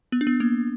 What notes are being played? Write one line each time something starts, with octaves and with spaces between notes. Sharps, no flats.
B3
D4
B3
A#3